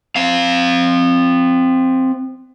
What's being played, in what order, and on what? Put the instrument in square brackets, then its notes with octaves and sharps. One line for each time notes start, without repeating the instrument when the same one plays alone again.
[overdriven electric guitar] C4 F5